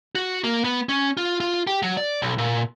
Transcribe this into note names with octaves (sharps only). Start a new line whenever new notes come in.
F#4
A#3
B3
C#4
F4
F4
G4
F#3
D5
B1
A#2